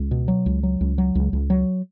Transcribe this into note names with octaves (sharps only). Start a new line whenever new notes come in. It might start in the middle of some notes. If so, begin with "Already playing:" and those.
Already playing: C#2
B2
F#3
C#2
F#3
C#2
F#3
C#2
C#2
F#3